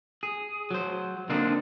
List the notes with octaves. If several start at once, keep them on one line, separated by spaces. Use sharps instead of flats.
G#4
F#3 C5
D3 A#3 C4 D4 D#4